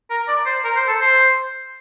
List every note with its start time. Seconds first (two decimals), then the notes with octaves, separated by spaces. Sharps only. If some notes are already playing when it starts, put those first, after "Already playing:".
0.10 A#4
0.28 D5
0.46 C5
0.64 A#4
0.76 C5
0.88 A4
1.01 C5